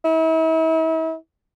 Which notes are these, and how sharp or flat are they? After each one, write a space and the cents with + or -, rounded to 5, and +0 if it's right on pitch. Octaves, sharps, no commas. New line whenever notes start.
E4 -40